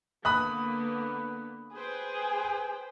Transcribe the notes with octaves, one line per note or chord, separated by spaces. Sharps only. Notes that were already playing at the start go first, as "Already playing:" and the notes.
D3 A#3 B3 B5 D#6 F#6
G#4 B4 C5 G5